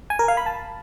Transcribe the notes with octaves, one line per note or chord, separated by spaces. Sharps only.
G#5
A#4
F5
B5
A5